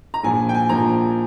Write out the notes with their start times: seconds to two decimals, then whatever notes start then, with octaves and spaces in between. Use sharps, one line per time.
0.14 A#5
0.24 A#1 A#2 F3 G#5
0.49 G5
0.54 G#5
0.69 A#1 A#2 F3 A#5